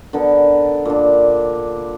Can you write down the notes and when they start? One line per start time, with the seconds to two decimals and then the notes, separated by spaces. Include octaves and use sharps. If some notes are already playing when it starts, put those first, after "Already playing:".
0.13 D3 B3 A4 A#4
0.85 A#2 D4